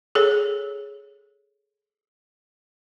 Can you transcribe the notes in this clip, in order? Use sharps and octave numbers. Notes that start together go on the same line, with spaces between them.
G#4 A4 C#5